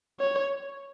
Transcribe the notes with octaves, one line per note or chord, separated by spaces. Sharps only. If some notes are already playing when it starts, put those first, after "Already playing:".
C#5